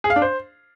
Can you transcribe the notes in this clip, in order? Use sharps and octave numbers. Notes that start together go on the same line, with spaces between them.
G#4
F5
D4
C5